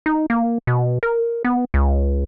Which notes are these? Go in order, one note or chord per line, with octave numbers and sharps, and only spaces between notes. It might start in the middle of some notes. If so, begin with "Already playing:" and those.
D#4
A#3
B2
A#4
B3
C#2